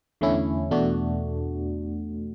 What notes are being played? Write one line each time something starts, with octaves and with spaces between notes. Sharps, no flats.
E2 D3 A3 C#4 E4
E2 B2 A3 D4 F#4